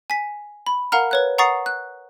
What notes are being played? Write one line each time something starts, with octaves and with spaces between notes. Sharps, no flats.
G#5 B6
B5
A#4 F5 F#5 A#5 F6
B4 C#5 F#6
F#5 A#5 C#6 D#6 A6 C7
F#6